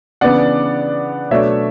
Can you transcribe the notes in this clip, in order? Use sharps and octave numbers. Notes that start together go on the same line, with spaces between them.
C#3 E3 B3 D4 D5 F#5
B2 F#3 A3 D4 C#5 E5